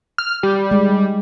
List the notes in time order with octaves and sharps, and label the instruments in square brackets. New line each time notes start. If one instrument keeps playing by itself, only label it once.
[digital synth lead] F6
G3
[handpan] G#3